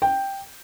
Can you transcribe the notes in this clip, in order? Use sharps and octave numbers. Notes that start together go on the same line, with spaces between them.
G5